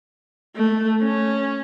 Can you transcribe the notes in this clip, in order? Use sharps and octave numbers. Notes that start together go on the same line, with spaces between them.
A3
C#4